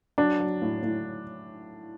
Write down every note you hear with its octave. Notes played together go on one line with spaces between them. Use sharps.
F#3 D4
F#3
A2
A2